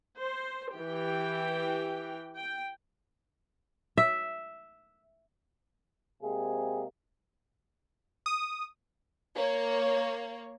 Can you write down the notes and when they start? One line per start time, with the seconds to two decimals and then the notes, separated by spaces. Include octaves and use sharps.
0.20 C5
0.74 E3 G4 G5
2.35 G5
3.97 E5
6.22 C3 G#3 A#3 C4 G#4
8.26 D#6
9.36 A#3 C#5